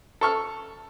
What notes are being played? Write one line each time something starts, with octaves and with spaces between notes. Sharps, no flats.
A4 C#6 F6